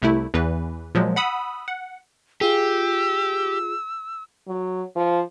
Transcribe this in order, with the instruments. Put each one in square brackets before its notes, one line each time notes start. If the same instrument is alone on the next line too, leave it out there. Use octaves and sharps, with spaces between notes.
[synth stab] C2 C3 A3 E4
E2 E3 B4
A#2 F3 F#3 G#3
F#5 B5 D#6 E6
F#5
[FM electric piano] F4 G#4 [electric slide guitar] G4 [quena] E6
[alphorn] F#3
F3